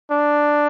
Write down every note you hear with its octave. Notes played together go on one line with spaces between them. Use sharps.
D4